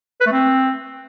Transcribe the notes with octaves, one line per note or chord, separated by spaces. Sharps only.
B4
A3
C4